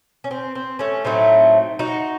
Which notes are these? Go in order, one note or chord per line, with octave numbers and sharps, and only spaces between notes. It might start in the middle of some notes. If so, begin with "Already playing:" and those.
C#4
C4
C4
A3 C#4
A2 F#3 A3 C4 D#4
D#4 F#4